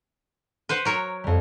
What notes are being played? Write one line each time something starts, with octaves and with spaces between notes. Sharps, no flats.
B4 C5 F#5
F#3 A#4 C#5
F2 G3